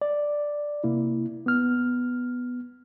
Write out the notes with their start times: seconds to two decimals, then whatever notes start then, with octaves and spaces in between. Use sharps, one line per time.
0.02 D5
0.84 C3 A#3 E4
1.46 B3 F6